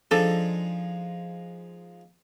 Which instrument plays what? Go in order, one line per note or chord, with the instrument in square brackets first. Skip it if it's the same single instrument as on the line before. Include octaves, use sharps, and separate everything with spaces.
[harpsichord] F3 G#3 D#4 [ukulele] D4 A4